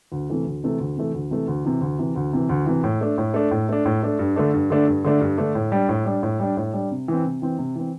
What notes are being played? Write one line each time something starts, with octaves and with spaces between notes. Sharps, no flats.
D2
C3 E3 A3
D2
C3 E3 A3
D2
C3 E3 A3
D2
C3 E3 A3
D2
C3 E3
D2
C3 E3
D2
C3 E3
D2
C3 E3
A2
A3 D4
A2
A3 D4
A2
A3 D4
A2
A3 D4
G2
D3 A3 D4
G2
D3 A3 D4
G2
D3 A3 D4
G2
D3 A3 D4
A2
G3 D4
A2
G3 D4
A2
G3 D4
A2
G3 D4
C3
E3 C4
C3
E3 C4
C3
E3 C4